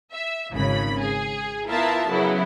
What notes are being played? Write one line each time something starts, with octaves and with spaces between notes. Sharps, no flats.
E5
G#1 C#3 B5
G#4
B3 E4 F4 A#4 E5 A5
F#2 C#3 F#3 B3 E4